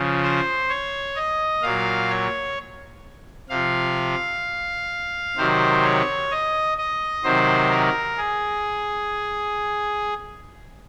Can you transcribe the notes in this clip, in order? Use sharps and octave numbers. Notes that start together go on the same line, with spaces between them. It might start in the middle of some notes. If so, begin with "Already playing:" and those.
Already playing: C#3 F3
C5
C#5
D#5
A#2 F#3 F5
C#5
C3 F3 F5
C3 D#3 F#3 C5
C#5
D#5
D#5
C3 D#3 F#3 C5
A#4
G#4